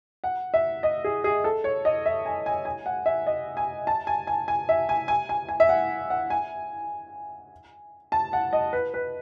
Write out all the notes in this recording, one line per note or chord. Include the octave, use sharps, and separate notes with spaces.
F#5
E5
D#5
G#4
G#4
A4
C#5
D#5
E5
G#5
G#5
G#5
F#5
E5
D#5
G#5
A5
G#5
G#5
G#5
E5
G#5
G#5
G#5
G#5
E5
F#5
F#5
G#5
A5
F#5
D#5
B4
B4